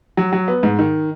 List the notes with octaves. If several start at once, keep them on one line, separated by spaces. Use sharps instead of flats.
F#3
F#3
B3
G#2
D#3